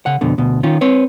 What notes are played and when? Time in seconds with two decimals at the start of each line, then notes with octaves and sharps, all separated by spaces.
0.06 C#3 F#5
0.21 F2 B2 D3
0.38 D2 B2
0.63 D#3 C#4 F4
0.81 C4 B4 C#5